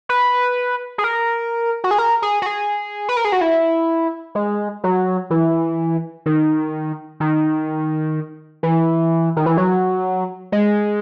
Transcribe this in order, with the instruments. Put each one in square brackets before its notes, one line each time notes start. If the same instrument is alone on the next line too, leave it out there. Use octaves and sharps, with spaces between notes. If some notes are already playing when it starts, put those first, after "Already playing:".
[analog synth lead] B4
G#4
A#4
F#4
G#4
A#4
G#4
F#4
G#4
B4
A#4
G#4
F#4
E4
G#3
F#3
E3
D#3
D#3
E3
D#3
E3
F#3
G#3